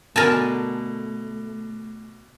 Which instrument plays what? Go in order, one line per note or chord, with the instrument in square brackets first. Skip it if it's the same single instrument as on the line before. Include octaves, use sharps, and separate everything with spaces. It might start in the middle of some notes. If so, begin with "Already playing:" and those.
[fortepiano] B2 D3 [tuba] A3 [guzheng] A#4 G#5 A5